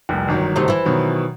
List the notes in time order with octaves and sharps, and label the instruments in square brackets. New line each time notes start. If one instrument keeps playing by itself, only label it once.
[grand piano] F1 C2
G1 D#3 F#3
[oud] C3 A3 D#4
E3 E4
[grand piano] B2 D#3 F#3